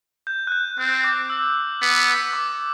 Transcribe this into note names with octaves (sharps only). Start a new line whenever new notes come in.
G6
F#6
G6
C4 F#6
D6
E6
B3
D6